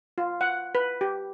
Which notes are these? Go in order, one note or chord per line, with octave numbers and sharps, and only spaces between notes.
F4
F#5
B4
G4